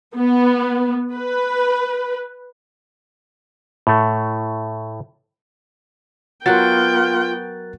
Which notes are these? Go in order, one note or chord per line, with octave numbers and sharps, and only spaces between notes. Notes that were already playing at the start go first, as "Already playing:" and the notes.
B3
B4
A2 A3
F#3 B3 F4 F#4 A#4 G5 F#6 A6